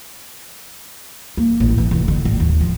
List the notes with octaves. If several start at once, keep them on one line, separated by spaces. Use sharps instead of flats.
A#3
A1
E3
F1
D3
A1
D#2
F3